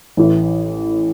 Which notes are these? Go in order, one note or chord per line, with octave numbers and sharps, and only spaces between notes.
A1 A2 E3